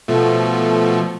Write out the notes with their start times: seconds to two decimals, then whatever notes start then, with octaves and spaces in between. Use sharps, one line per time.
0.08 B2 F3 A3